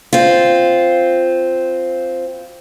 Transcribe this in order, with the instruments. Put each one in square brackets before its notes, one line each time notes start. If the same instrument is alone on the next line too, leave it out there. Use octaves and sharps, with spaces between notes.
[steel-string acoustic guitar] C4 F4